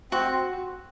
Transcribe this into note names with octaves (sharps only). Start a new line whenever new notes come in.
C4 F#4